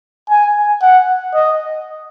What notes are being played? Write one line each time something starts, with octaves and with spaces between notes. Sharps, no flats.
G#5
F#5
D#5